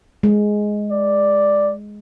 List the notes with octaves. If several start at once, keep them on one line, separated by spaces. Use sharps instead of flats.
G#3
D5